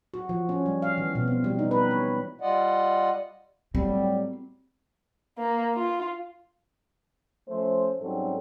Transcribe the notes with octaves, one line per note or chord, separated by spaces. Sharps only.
F#4
F3
C#4
G3
F5
E3
B2
C4
G3
D#4
B4
C#5
G3 F4 D5 D#5 F#5
A2 F#3 G3 C4
A#3
F4
F3 A3 C#4 C5
G#2 F#3 G3 C4 C#4 A4